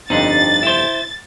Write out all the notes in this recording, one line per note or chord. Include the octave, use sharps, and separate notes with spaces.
G1 F2 C4 D4 D#4 A6
E4 C5